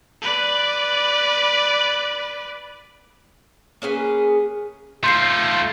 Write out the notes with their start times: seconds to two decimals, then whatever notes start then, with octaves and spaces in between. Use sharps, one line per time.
0.22 B4 D5
3.82 A#3 C#4 G#4 B4
5.04 A3 F4 C6 G6 C7